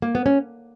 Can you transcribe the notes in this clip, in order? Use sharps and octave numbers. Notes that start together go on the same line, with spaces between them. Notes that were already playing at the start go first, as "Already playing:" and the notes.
A#3
B3
C#4